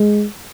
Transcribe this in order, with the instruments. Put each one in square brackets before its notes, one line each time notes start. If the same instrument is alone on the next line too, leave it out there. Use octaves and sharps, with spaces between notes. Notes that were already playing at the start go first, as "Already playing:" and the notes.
Already playing: [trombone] G#3